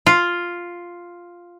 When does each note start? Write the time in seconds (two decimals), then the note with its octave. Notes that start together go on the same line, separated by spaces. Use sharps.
0.06 F4